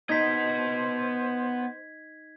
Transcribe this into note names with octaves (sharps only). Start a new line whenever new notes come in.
B3 D#4 C5 D#5 G#6 B6